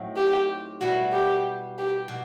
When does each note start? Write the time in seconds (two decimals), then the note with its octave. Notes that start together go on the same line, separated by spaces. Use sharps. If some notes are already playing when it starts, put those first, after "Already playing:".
Already playing: A2 F#3 C4 D#4
0.16 G4
0.81 B2 G3 B3 E4 F#4
1.12 G4
1.78 G4
2.08 B2